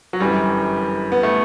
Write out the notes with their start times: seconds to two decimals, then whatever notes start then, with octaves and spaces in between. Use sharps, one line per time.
0.13 F#3
0.20 G1 F#2 E3 G3
1.12 B3
1.23 A3